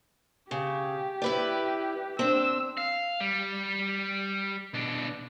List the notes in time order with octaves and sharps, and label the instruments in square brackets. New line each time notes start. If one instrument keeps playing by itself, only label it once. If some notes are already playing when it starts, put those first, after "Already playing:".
[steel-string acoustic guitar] C#3 [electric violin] G4
[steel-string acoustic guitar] E4 B4 D5
[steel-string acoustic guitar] C4 D4 [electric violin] E6
[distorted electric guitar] F5
G3
B2 D4